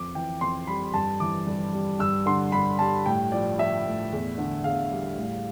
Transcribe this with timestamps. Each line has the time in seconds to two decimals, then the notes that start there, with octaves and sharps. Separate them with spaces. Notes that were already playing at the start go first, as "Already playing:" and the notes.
Already playing: F2 D6
0.15 E3 G5
0.41 F2 C6
0.67 G3 B5
0.94 G2 A5
1.20 E3 D6
1.47 G2
1.73 G3
1.99 G2 E6
2.26 D3 C6
2.52 G2 B5
2.79 G3 A5
3.06 A2 G5
3.32 F3 D5
3.59 F3 E5
3.85 A2
4.12 E2
4.38 D3
4.64 E2 F5
4.91 G3
5.18 A2